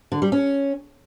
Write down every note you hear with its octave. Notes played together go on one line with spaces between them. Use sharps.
D3
G3
C#4